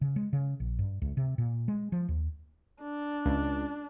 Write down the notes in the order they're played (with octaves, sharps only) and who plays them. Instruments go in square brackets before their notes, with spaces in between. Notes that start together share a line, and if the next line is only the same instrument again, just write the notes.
[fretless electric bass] C#3
G#3
C#3
A#1
G2
C#2
C3
A#2
G#3
F3
D#2
[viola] D4
[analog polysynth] C#2